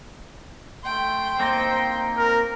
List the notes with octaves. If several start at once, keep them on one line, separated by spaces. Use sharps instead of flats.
A3 G5 C6
A#3 C4 D#4 C5
A#4